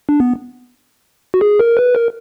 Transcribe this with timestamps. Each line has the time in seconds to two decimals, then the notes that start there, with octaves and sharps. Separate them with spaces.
0.09 D4
0.20 B3
1.34 F#4
1.41 G#4
1.60 A#4
1.77 B4
1.95 A#4